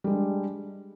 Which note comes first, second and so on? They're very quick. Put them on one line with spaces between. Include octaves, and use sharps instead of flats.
G3 G#3 D4